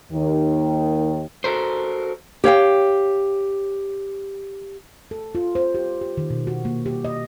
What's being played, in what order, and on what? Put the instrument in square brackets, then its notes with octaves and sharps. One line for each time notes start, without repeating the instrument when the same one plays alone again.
[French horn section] D#2 D#3
[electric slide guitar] F#4 A4 A#4 C5
[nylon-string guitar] G4 C#5 F5 G5
[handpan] A4
F4
C5
G4
G4
D#3
B2
F#4
A#3
G4
D#5